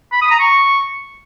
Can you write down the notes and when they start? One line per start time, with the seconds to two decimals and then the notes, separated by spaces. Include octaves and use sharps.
0.12 B5
0.21 D#6
0.31 A#5
0.40 C#6